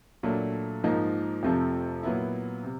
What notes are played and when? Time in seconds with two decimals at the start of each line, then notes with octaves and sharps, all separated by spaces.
0.23 A#2 F#3 A3 D4
0.84 G#2 F3 A#3 D#4
1.43 F2 C3 F3 A3 C4
2.03 A#2 F#3 B3 E4
2.64 C3